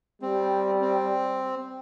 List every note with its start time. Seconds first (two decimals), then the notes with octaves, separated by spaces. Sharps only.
0.22 G3 C4
0.81 C4